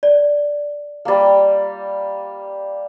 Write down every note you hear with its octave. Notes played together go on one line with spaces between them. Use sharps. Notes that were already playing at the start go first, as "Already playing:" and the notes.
D5
G3 A#3